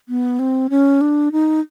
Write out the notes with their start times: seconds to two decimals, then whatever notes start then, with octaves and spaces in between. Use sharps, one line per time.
0.09 B3
0.39 C4
0.70 C#4
1.01 D4
1.32 D#4